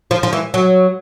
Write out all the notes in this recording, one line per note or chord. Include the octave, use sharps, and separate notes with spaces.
F3
F3
E3
F#3